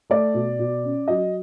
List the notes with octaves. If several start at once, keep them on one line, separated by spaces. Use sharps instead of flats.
A3 D5
B2
B2
C#4
F#3 D#5